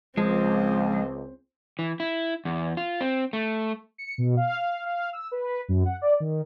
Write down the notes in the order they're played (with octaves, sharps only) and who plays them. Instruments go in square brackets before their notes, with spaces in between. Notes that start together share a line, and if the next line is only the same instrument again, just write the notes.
[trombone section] C#2 [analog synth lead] F3 [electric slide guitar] G#3 [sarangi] C4
[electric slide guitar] E3
E4
E2
F4
C4
A3
[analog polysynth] C#7
B2
F5
F5
E6
B4
F#2
F#5
D5
D#3